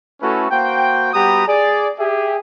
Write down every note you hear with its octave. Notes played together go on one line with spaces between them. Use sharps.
A3 C#4 E4 F#4 A4 B4
A#3 F#4 C5 G5
G3 B3 F#4 G4 A#5 D#6
G#4 D5
G4 G#4 E5